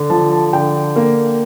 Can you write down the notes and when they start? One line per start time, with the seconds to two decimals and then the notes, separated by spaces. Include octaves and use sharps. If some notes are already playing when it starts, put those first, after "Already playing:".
Already playing: D3
0.10 F3 A5
0.32 A5
0.53 D3 G5
0.96 A#3